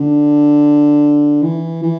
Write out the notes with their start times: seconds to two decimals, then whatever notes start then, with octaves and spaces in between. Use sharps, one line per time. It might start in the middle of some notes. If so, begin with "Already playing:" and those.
Already playing: D3
1.42 E3
1.82 E3